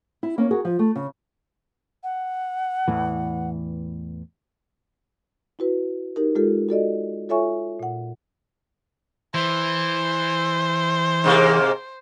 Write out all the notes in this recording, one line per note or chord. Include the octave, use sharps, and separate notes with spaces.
E4
A#3 C#4
F#4 G#4 A#4
F3
A3
C#3
F#5
E2 A2 E3
E4 F#4 B4
D#4 G4 A#4
G#3 F4 G4 A4
F#4 A4 D5 D#5
F4 A4 C#5 E5 G#5 C#6
A#2 F#5
E3 C5
G#2 C3 A#3